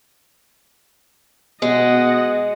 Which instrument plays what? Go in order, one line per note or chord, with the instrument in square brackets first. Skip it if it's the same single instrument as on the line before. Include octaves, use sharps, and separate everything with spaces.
[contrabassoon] B2 [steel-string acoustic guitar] G#3 [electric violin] D#5 F#5